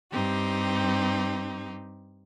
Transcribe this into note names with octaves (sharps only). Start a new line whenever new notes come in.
G2 C4 D#4 G4